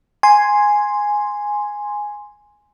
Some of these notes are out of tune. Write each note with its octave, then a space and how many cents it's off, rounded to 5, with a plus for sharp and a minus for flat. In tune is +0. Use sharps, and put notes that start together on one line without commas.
G#5 +0 C6 +0